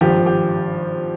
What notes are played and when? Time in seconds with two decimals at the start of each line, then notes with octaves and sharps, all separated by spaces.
0.01 G#1 G2 F3 G4
0.26 G4